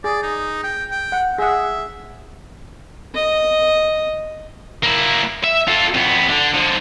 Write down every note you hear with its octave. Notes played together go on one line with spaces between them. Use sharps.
G#4 D5
D#4
G5
G5
F#5
G#4 E5 F#5
D#5
A#3 E4
E5
F4 A4
F2 B3
D3
D3 F3